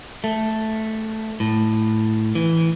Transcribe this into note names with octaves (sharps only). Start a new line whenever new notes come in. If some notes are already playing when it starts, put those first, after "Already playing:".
A3
A2
E3